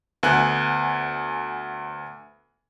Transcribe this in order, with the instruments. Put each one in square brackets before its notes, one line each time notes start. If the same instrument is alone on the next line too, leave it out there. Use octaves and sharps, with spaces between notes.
[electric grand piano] D2 B3 G#5 F#6